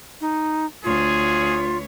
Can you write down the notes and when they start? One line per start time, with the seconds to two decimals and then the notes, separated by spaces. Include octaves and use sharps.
0.21 D#4
0.84 D2 F4 G#4 C#5